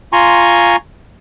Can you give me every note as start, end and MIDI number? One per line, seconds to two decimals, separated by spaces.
0.13 0.76 65
0.13 0.76 80
0.13 0.76 82
0.13 0.76 84
0.13 0.76 85